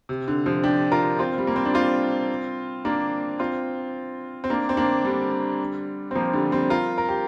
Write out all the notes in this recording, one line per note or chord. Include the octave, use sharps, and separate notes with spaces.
C3
D3
C3 F3
D4 G4
F4 A#4
C4 F4
G3
A#3
C4
D4
C4 F4
A#3 D4
C4 F4
C4
A#3 D4
C4
A#3 D4
D3 G3
C4
F3 A#3
D3 G3
G3 C4
F4 A#4
A#4
G4